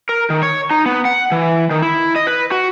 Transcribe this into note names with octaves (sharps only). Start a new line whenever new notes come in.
A#4
D#3
C#5
D#4
B3
F#5
E3
D#3
E4
D#5
B4
F#4